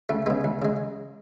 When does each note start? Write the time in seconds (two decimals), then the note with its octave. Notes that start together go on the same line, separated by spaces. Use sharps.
0.09 C#2 A3
0.26 C#3 G#3 B3
0.44 C#2
0.62 C#3 G#3